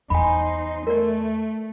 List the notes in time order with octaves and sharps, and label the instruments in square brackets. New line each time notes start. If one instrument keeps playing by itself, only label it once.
[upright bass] E2 B3 [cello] D#4 C5 [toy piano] G#5 B5
[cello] A3 [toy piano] A#4 D5